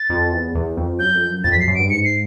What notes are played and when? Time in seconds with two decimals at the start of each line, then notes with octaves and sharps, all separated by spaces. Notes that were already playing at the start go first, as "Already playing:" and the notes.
Already playing: A6
0.09 F2
0.32 E2
0.55 E2
0.77 F2
0.99 F#2 G6
1.15 F2
1.30 F#2
1.44 F2 A6
1.52 B6
1.56 F#2
1.60 C7
1.67 F#2
1.75 G2 D7
1.90 G#2 C#7
2.05 C7